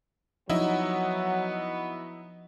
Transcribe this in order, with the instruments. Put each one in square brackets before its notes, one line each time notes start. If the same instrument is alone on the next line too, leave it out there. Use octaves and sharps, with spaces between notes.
[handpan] F3 [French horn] F#3 [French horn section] B3 F#4 [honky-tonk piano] D#4 E4